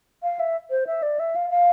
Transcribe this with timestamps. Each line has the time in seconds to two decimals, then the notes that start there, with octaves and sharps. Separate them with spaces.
0.23 F5
0.39 E5
0.70 C5
0.87 E5
1.02 D5
1.19 E5
1.35 F5
1.50 F5